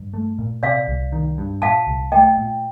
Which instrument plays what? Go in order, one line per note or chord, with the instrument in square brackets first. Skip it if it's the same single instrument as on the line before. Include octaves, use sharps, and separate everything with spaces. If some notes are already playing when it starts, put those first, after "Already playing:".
Already playing: [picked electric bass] G2
A3
A#2
[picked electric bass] C3 [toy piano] D5 F5
[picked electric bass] C2
D#3
G2
[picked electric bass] A#2 [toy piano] F5 A5
[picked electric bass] C2
[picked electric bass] A3 [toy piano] D#5 G5
[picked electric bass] A#2